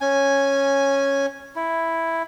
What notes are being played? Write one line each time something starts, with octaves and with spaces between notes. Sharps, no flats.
C#4 G#5
E4